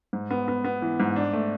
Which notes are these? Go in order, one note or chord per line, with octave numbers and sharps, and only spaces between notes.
G#2
B3
B3
B3
E3
G#2
D4
A3